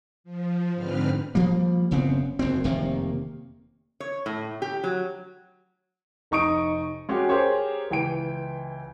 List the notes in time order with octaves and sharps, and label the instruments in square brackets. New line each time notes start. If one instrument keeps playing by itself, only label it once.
[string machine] F3
G#2 D3 C4 B4 F6
[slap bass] F3 G3 A#3
F#1 C#3 B3 C4
F#1 F#2 C4
F1 C3 D#3 A#3
[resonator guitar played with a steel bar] C#5
A2
G4
F#3
[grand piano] F1 D#4 C#6 D#6 D7
G#3 C#4 F#4 G4
G4 G#4 A#4 C5 C#5
C#2 E3 G5 D7